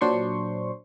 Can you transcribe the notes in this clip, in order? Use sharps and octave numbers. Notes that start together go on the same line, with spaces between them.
A#2 F#3 D4 C5 C6 C#6